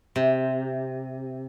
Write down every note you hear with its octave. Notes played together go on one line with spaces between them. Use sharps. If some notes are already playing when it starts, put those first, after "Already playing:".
C3